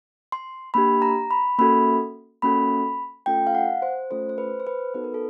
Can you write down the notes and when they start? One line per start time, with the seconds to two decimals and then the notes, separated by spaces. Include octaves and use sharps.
0.32 C6
0.74 A#3 D4 G4 B5
1.02 A#5
1.31 B5
1.59 A#3 C#4 F#4 A4 B5
2.42 A#3 C#4 F#4 A4 B5
3.26 A3 C#4 F4 A4 G5
3.47 F5
3.55 F#5
3.82 C5
4.11 A3 C#4 F4 A4 C5
4.29 C5
4.38 B4
4.60 C5
4.67 B4
4.94 B3 D#4 F#4 A4 B4
5.04 A#4
5.14 A4